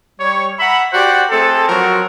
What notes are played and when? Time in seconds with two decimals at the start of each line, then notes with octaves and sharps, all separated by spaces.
0.20 G3 C#5
0.59 E5 F#5 A#5 B5
0.92 F#4 G4 C5 D5 F#5
1.30 A3 C4 G#4 A4
1.68 F3 F#3 C4 F#4 A#4